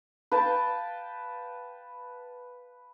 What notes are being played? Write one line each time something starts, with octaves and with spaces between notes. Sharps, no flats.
B4 F5 G5 A5